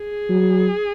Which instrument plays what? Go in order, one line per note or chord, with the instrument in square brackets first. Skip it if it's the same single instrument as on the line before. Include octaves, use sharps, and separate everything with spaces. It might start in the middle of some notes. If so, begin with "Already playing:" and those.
Already playing: [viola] G#4
[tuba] F#3